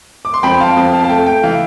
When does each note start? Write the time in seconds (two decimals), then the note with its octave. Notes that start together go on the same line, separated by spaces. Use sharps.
0.25 D6
0.34 C6
0.43 F2 G5 B5
0.60 F5 A5
0.77 F2 G5
0.93 F5 A5
1.04 A5
1.09 A3 G5
1.26 G5
1.43 E3 F5